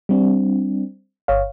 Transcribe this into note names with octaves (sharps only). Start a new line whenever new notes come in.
G3 C4 D4
G1 C#5 F5